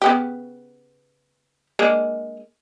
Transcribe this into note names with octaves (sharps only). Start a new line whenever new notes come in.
C#3 B3 G4
G#3 A#3 D4